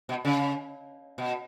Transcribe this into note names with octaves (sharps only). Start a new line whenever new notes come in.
B2
C#3
B2